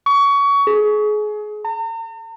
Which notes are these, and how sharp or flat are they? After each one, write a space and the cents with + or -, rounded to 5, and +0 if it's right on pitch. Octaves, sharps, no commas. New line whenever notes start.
C#6 +25
G#4 +30
A#5 -45